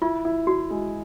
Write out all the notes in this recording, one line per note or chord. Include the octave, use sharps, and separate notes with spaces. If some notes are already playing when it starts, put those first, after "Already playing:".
E4 F4
E4
E4 F#4
G#3